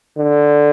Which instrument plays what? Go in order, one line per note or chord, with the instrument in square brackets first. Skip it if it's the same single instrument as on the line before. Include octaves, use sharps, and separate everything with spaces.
[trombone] D3